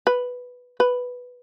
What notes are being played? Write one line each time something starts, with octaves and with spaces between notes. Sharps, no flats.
B4
B4